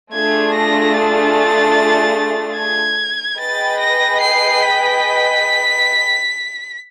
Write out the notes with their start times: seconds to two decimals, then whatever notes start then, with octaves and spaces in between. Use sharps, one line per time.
0.14 A3 D4 F4 G#4 G#6
0.54 A#6
0.94 A6
2.57 G#6
3.39 G#4 B4 D#5 G5 A6
3.80 A#6
4.21 C7
4.62 B6